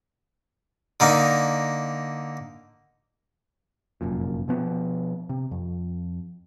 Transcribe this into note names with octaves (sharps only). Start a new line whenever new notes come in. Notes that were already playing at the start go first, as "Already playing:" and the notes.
D3 A#3 D#4
F1 F#2 A#2
B2 F3 B3
C3
F2